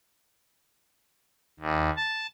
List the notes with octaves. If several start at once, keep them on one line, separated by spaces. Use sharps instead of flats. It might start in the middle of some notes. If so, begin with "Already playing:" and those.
D#2
A5